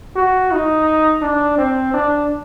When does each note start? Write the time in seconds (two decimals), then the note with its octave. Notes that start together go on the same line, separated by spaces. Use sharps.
0.16 F#4
0.51 D#4
1.22 D4
1.58 C4
1.94 D4